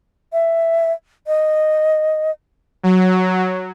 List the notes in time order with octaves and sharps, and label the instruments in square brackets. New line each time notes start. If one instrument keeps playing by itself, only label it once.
[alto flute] E5
D#5
[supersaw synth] F#3